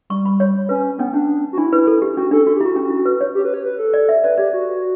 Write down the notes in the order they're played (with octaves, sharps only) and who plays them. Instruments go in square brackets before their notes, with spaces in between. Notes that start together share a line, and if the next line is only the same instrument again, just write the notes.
[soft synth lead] G3 [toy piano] C#6
[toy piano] B5
C#5
[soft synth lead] C#4 [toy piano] B4
[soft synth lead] B3 [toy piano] C#4
[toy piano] C#4 [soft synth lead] D4
[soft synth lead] F#4
[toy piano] D4 [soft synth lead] E4
[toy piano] B4
A4
G4
[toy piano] C#4 [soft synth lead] F#4
[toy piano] D4 [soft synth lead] A4
[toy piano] F#4 [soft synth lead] A4
[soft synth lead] G4
[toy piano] E4
[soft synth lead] F#4
[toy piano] C#4
E4
B4
C#5
[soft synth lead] G4
B4
C#5
B4
A4
[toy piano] D5
E5
[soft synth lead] B4 [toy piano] D5
[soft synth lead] G4 [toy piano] D5
[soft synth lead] F#4